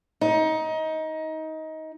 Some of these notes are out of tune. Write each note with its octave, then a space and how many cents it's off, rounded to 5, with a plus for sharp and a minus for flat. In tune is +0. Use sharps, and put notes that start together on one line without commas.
D#4 +20